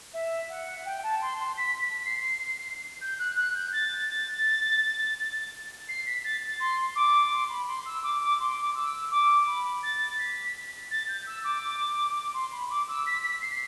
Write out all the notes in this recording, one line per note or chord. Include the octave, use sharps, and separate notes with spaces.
E5
F#5
G5
A5
C6
C6
B6
B6
C7
G6
F#6
F#6
G6
A6
A6
C7
B6
A6
A6
C6
D6
C6
B5
C6
E6
D6
D6
C6
D6
E6
D6
B5
A6
B6
A6
G6
E6
D6
C6
B5
D6
E6
B6
B6
C7